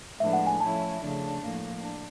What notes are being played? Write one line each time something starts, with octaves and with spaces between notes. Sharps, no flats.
A2 F3 G#3 B3 D4 E5
F#5
G#5
F3 A3 C#4 E4 A5
C#3 F3 A3 D4
A2 F3 A#3
D4